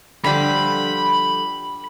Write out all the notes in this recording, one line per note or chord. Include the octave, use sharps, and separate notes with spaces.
D3 F3 G3 B5